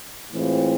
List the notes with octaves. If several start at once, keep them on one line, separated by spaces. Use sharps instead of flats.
A2 E3 G#3 C4 F4